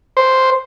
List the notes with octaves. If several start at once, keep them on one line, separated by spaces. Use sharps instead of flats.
C5